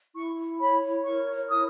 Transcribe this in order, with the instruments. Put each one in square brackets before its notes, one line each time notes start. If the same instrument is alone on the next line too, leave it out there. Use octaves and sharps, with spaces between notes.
[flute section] E4 C#6
C#5 B5
A#4 C#6
E4 D#6